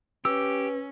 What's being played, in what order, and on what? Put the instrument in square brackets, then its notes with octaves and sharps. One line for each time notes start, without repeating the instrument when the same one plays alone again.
[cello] C#4 [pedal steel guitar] G4 [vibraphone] B4 [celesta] E6